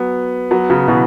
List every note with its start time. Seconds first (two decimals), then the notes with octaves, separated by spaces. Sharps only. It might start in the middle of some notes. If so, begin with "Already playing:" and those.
Already playing: F#3 B3
0.51 F#3 B3
0.70 C#3 F#3
0.88 B2 E3